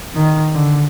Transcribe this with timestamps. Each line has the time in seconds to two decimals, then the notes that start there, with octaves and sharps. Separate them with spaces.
0.16 D#3
0.54 D3